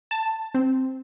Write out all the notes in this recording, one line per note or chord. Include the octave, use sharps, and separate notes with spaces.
A5
C4